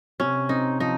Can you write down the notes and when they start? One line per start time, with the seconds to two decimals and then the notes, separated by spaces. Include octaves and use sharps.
0.20 C3 C#4
0.49 C4 D#4
0.80 F3 D#4